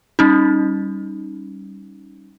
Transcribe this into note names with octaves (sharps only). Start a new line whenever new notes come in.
G3 C#4 D#4